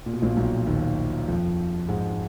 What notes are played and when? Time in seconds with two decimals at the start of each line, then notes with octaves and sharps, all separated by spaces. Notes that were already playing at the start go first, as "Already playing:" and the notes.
0.06 A#2
0.13 B2
0.22 A#1 A#2
0.36 B1 B2
0.66 D#2 D#3
1.28 F2 F3
1.89 G#2 G#3